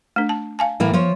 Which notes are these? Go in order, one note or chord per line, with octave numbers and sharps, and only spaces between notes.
A3 D4
A5
F5 G#5 A5
A2 E3 A#3
F3 C#5